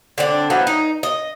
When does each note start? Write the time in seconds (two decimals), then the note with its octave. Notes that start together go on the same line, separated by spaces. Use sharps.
0.18 D3 C4 D4
0.50 F3 F#3 B3 E4
0.67 D#4
1.03 D#5